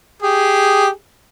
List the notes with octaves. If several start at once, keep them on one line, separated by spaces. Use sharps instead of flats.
G4 G#4